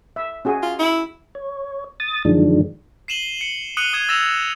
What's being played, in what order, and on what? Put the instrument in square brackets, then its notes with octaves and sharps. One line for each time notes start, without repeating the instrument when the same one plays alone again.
[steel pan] E5
C#4 F#4 G#4
[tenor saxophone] F4
E4
[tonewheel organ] C#5
D#6 A6
F#2 D3 D#3 F3 G#3 D4
[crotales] C7 D#7 E7 F#7 G7
C#7
D#6 F#6 C#7 D#7 F#7 G7
D#6 G#6 E7
E6 A6 A#6 E7 F7